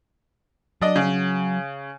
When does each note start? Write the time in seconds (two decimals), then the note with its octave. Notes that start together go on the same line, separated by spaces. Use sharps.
0.81 F#3 D4 D#5
0.96 C#3